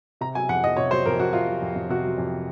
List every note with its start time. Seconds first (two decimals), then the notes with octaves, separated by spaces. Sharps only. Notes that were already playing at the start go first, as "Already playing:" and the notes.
0.21 C3 A#5
0.35 F#3 G#5
0.49 F2 F#5
0.64 F2 D#5
0.77 C3 C#5
0.91 F#3 C5
1.06 F2 A#4
1.19 F2 F#4
1.33 C3 F4
1.48 F#3
1.62 F2
1.76 F2
1.89 C3 F#4
2.04 F#3
2.18 F2